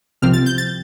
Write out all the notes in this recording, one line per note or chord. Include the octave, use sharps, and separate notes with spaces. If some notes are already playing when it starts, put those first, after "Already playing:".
C2 C3 F3 C4 F6
A6
G6
A6